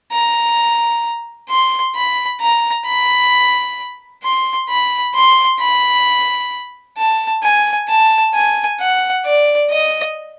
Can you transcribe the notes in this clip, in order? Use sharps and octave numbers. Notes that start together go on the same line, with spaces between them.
A#5
C6
B5
A#5
B5
C6
B5
C6
B5
A5
G#5
A5
G#5
F#5
D5
D#5